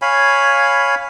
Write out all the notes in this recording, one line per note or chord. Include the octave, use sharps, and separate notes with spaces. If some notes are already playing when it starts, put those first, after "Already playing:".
C#5 F5 G#5 B5